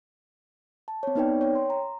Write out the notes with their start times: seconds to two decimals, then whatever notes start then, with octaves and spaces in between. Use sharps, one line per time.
0.88 A5
1.03 C4 C#5
1.15 B3 C4 D#4 B4 D5 G5
1.41 C#5 G5
1.55 C6
1.70 A#5